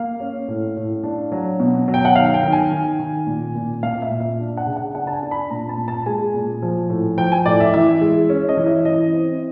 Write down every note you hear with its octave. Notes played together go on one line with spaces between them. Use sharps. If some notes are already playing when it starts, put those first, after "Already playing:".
Already playing: A#3 F5
C#4
A2
A2
D4
F#3
B2
F#3
G5
F#5
D#3 F5
G5
D#3
G#5
D#3
D#3
A#2
A#2
A#2 F5
E5
A#2
E5
D4
F#5
C#3
F#5
D4 F#5
A5
G#5
D4
B5
A#2 A#5
A5
A#2
A5
G#3 G#5
A#2
F3
A2
F3 G5
G#5
A2 D5
E5
E3 E5
G#3
C#4
D#5
E3
E5
E3 D#5
C4